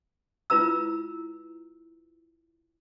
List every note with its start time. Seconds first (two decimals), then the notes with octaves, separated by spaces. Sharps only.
0.50 E4 F4 B4 A#5 E6